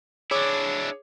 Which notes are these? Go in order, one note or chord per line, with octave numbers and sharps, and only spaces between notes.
D4 E4 G#4 C#5 D6